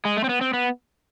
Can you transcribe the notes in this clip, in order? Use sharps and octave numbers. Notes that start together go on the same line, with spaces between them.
G#3
A3
C4
B3
C4
B3